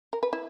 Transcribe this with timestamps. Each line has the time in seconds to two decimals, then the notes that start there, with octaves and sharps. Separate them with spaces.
0.13 A#4
0.23 B4
0.33 E4